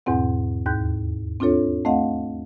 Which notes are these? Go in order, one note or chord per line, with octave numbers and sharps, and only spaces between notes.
E2 G#2 B2 C4 F#5
D#2 G#2 F#6 G6
C4 D4 F4 A4 C#5
A3 C4 D#5 F5 F#5